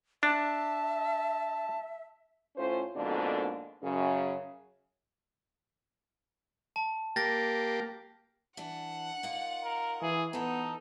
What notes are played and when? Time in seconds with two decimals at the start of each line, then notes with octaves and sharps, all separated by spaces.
0.23 D4 E5 A5
2.57 A2 C#4 F4 C5
2.95 F2 G#2 B2 D3 A#3 D4
3.82 F#2 C#3
6.76 A5
7.16 A#3 G4 A6 A#6
8.57 E3 D4 F#5
9.23 A#3 D#4 F4
9.64 A#4
10.02 E3 G#4
10.33 E3 B3 D#4 A4